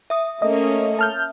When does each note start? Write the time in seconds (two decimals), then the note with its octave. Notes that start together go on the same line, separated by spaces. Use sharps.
0.10 E5 D#6
0.42 A3 A#3 C#4 D#5
0.99 A5 F6 G6